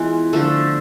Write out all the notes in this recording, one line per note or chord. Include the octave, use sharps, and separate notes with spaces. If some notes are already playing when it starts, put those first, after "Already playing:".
Already playing: E3 G#3 B3 F4
D3 F3 A3 A4